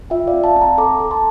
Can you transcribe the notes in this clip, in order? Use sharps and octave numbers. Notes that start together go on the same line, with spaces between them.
F4 E5 G5
D5 F5
C4
F5 A5
C4 A5
G5 A#5
A4 A#5 D6
A4
A5 C6